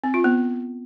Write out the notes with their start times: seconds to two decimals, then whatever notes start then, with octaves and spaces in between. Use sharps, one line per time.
0.04 C4
0.14 F4
0.24 B3